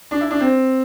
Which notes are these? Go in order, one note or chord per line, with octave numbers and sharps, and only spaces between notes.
D4
E4
D4
C4